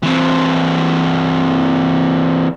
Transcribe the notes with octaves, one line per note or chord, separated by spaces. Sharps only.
E3 C4